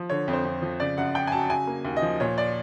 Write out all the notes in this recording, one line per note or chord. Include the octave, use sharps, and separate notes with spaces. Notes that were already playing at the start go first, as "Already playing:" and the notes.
Already playing: F3
D3 C#5
F2
C5
F2
F3
C#3 D5
F#2 F#5
F#2 G5
G#5
F#3 A5
C#3 G#5
A#3
D#2
D#5
F3
A#2 C#5
D5